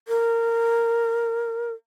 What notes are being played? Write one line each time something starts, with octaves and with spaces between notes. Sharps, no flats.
A#4